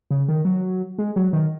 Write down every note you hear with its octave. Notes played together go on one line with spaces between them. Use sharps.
C#3
D#3
F#3
G#3
F#3
D#3